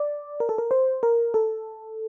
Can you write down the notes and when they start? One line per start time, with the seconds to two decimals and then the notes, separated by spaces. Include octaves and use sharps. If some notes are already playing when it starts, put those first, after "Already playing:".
Already playing: D5
0.40 A#4
0.49 A4
0.58 A#4
0.71 C5
1.03 A#4
1.34 A4